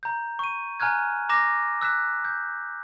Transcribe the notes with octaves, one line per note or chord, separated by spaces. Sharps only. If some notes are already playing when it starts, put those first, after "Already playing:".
A#5 G6
C#6 D#7
G#5 A#5 F6 F#6 G#6
A#5 D6 A#6 E7
E6 F#6 B6 E7
G6